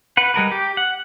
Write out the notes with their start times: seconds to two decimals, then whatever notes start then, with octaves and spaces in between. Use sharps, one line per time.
0.17 B4 F#5
0.34 G3 G#3 A#4 B4
0.51 G4
0.77 F#5